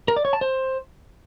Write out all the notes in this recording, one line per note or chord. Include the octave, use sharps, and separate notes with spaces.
A#4
D5
C#5
A5
C5